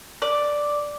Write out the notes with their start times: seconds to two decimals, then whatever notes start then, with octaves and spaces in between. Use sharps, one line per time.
0.22 D5